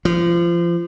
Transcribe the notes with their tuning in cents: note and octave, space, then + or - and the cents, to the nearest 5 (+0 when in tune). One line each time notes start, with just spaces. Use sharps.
F3 -30